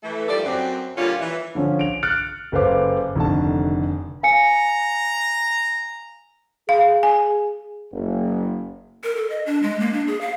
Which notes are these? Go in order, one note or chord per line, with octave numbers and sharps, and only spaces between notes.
E3 A3
D#2 F3 G3 A3 A4 D5
F#2 C4
A#2 D3 G3 C#4 F4
E3
D3 F3 C#4
D7 F7
F6 F#6 A6 C#7 D7
F#1 A4 B4 C5 F5 D6
F1 D3 D#3 A5
F5 G#5 A#5 C#7
G#4 F5
G#5
F#1
A#4
A4
D#5
D4
G#3
A#3
D4
G#4
F5